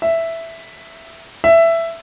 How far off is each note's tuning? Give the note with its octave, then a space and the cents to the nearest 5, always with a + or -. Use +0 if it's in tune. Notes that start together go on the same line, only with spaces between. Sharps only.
E5 +0
E5 +10